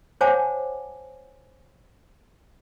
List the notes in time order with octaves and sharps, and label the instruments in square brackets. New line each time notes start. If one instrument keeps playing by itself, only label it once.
[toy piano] C5 C#5 F#5 G#5 A5 D6